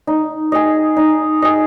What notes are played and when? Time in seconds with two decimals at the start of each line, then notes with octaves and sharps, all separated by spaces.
0.07 D#4
0.52 G#4 D#5
0.97 D#4
1.42 G#4 D#5